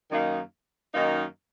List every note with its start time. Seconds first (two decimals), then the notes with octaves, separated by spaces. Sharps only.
0.10 F#2 D#3 A#3 D#4
0.94 F#2 D#3 A#3 D#4